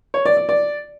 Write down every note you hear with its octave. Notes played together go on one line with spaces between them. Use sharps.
C#5
D5
D5
D5